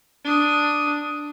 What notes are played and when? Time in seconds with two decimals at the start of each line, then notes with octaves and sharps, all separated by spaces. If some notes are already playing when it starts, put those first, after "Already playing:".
0.25 D4 D#6